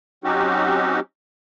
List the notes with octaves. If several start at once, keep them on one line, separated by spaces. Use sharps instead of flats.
F#3 C4 C#4 D#4 F#4 G4